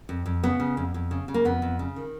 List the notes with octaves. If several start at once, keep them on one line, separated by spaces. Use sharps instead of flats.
F2
F2
C#3 B3
C#3
F2
F2
C#3
C#3
A#3
F2 B3
F2
C#3
D#3